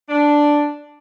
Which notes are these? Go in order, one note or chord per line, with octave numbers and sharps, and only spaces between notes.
D4